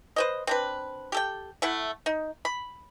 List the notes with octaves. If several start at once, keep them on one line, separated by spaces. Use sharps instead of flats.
B4 C5 D#5
C4 D4 B4
G4 A4 G5
A3 E4 F#5
D#4
B5